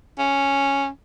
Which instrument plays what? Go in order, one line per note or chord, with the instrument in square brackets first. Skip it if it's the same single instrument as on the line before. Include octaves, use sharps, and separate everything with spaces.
[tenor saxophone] C#4